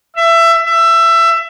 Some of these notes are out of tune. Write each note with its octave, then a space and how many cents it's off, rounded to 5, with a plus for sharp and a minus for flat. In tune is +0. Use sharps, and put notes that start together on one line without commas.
E5 +20
E5 +20